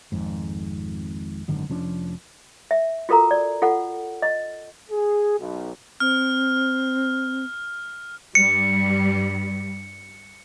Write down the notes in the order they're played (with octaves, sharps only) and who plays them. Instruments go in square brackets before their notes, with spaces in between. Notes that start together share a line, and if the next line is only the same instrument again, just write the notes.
[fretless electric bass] G#1 F2 G#2
G#1 F#2 D3 D#3
F1 F3 C#4 D4
[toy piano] E5
F4 F#4 A4 A#4 A#5
D5
F4 A4 F#5
D#5
[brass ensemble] G#4
B1
[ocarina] C4 [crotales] F6
[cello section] G2 G3 [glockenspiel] C#7